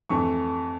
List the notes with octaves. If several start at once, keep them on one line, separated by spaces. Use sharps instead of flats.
F2 E3 A3 C#6